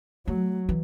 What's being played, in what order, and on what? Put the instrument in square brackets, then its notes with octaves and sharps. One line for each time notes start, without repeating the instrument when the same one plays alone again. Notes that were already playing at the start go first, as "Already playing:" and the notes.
[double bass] F#3 [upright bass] A3
[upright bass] E3